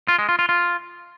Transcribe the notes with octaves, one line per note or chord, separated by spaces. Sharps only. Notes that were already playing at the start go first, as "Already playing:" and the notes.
F4
G#3
F4
F4
F4